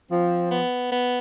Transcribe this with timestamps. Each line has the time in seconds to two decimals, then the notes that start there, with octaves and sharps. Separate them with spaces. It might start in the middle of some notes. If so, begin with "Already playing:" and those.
0.11 F3 C4
0.51 B3
0.92 B3